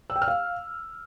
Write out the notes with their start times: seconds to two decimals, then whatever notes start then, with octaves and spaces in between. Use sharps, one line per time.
0.10 E6
0.16 G5
0.22 F6
0.28 F5